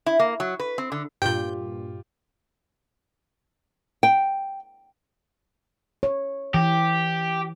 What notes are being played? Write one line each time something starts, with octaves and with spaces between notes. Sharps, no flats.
E4
A#3
F#3
B4
C4
D3
G2 A#2 F4 G4 G5 G6
G5
C#5
E3 G4